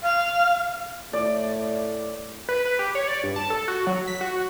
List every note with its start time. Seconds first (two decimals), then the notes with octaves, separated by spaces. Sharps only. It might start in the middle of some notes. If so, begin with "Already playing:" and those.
0.01 F5
1.13 A2 D5
2.49 B4
2.65 B4
2.79 G4
2.95 C#5
3.08 D5
3.23 G2
3.36 A5
3.50 A4
3.68 F#4
3.87 F#3
4.07 B6
4.21 F#4